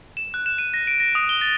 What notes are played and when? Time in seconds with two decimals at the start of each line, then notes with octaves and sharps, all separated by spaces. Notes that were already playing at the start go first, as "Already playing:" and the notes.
0.17 E7
0.34 F#6
0.46 E7
0.58 D#7
0.74 A#6
0.87 D7
1.00 A#6
1.15 D#6
1.29 G7
1.41 A6